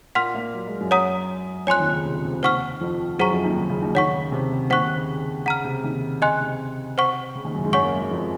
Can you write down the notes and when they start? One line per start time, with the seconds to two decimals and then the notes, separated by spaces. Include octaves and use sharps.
0.15 A#2 A#3 F#5 C6 F6
0.34 A#2 A#3
0.54 F#3
0.67 G#3
0.81 F#2 F#3
0.91 C#5 F#5 A#5 D#6
1.67 F2 F3 C#5 G#5 C6 F#6
1.80 D#2 D#3
1.93 C#3
2.05 C3
2.14 C#3
2.25 C3
2.33 C#3
2.43 D#2 D#3 C5 F#5 C#6 F6
2.80 F2 F3
3.19 F#2 F#3 G#4 C5 F#5 A#5 C#6
3.31 F2 F3
3.44 D#2 D#3
3.57 C#3
3.70 C#3
3.82 D#2 D#3
3.95 D#2 D#3 C#5 F#5 C#6
4.14 C#3
4.32 C3
4.51 C#3
4.70 D#2 D#3 C5 F#5 C#6 F#6
4.83 C3
4.96 C#3
5.46 C#3 F#5 A#5 F6
5.64 C3
5.84 D#2 D#3
6.22 C#3 D#5 G#5 C6 F#6
6.41 C3
6.98 C5 F#5 C#6
7.35 C#3
7.45 D#2 D#3
7.55 F#2 F#3
7.64 G#2 G#3
7.73 F#2 F#3 C#5 F#5 C#6
7.84 A#3
7.93 G#3
8.02 F#3
8.11 F2 F3